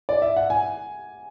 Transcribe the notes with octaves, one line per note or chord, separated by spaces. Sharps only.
D5
E5
F#5
G#5